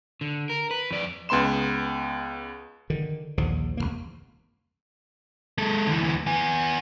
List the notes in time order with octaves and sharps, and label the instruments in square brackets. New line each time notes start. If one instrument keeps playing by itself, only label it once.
[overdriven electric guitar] D3
A#4
B4
F2 D5
[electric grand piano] C#2 B3 B5 C6 E7
[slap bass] D3 D#3
A#1 D#2 D3 F3
C2 F2 A#3
[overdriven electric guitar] G#3 A4
D2 E3
B3 G#5